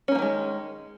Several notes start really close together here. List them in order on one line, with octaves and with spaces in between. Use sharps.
C#4 A#3 F3 D#3 G#3